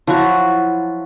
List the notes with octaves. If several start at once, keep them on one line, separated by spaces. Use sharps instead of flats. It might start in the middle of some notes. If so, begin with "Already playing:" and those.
F3 F#3 E4 F#4